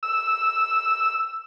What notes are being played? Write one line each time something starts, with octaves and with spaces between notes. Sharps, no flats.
E6